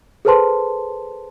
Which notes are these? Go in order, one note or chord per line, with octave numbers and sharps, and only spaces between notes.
G#4 A4 B4 C5 A5 C6